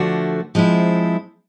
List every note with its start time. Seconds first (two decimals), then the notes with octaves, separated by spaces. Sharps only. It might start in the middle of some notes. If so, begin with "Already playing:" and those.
Already playing: D3 F3 A3 D4 F#4
0.55 F3 G#3 C4 E4